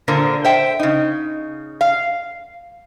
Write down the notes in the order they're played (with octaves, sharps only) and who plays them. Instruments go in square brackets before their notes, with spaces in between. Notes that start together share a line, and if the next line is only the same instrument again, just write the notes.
[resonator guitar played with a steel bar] A#2 D3 A#4 C5
C5 E5 G5
C#3 D#4
F5